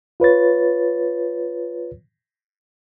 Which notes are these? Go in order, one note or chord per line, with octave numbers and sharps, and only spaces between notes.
F4 B4 C#5 A6